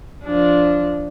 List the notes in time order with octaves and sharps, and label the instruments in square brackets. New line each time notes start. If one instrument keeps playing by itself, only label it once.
[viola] F3 D4